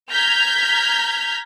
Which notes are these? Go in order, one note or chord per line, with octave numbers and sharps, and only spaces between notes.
A#5 F6 G6 G#6 B6